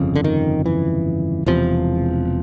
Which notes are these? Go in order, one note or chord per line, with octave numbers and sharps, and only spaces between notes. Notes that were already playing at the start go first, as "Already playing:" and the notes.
Already playing: G1 F2 C#3
D3
D#3
E3
E1 E2 C3 F3